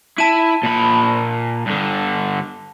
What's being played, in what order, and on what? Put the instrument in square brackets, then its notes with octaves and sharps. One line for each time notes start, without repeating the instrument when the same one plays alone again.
[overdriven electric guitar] E4 [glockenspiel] A5 D#7
[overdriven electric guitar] A#2 B5
G2 D3